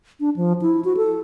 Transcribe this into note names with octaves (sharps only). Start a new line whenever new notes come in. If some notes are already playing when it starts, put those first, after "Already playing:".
D4
F3
E4
F#4
A4